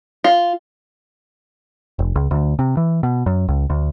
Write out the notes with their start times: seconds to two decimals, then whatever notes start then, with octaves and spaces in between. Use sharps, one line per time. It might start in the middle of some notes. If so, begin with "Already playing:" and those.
0.24 F4
1.99 F1
2.16 C#2
2.31 D2
2.59 C3
2.77 E3
3.03 B2
3.26 F#2
3.48 C#2
3.70 D2